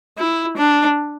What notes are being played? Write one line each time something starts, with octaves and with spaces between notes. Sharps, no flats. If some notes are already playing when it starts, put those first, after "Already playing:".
E4
D4